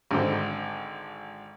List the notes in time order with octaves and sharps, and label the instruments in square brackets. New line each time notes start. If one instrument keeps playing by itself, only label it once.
[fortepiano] G#1 D3 C5